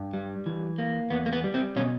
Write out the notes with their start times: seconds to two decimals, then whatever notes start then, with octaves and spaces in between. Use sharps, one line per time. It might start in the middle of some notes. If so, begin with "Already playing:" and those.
Already playing: G2
0.14 G3
0.46 E3
0.78 A#3
1.10 E2 B3
1.26 A#3
1.33 B3
1.44 G3
1.54 C4
1.76 B2 C#4